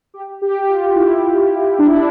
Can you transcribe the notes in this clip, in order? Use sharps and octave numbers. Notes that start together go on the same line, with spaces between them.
G4
G4
G4
F4
E4
D4
E4
D4